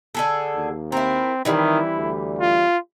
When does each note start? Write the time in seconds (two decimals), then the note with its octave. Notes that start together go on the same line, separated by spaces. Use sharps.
0.15 D3 G#4 A4
0.55 D#2
0.92 C4 E4 A#4
1.45 D#3 E3 G3 C4 E4
1.96 D2
2.39 F4